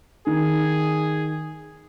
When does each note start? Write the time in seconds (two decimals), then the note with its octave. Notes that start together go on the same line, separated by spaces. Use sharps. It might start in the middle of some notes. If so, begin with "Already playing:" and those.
0.27 D#3 G#4